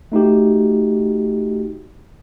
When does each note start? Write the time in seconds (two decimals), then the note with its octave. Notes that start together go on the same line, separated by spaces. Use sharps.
0.12 A3 D#4 F#4 G4